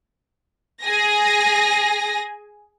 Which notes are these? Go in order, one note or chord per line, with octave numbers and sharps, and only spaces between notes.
G#4 G#5 A#6